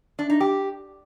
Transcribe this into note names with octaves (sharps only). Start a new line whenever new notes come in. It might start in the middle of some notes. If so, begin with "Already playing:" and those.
D4
D#4
G4